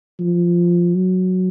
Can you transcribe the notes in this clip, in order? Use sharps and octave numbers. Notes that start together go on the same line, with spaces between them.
F3
F#3